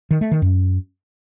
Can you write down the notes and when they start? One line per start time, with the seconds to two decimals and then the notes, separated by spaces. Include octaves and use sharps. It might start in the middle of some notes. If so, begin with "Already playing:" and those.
0.11 D#3
0.21 A3
0.31 D#3
0.42 F#2